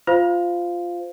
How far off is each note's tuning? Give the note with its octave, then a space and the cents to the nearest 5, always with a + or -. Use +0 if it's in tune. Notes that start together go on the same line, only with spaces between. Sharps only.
F4 +0 C5 -20 F5 -5